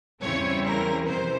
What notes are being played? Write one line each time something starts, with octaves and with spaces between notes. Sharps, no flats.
E2 C#3 G3 C4 E4 C#5
A#4
F2 C3 E3 C5